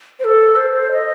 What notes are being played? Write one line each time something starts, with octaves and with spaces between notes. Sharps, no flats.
C5
A4
C5
C5
D#5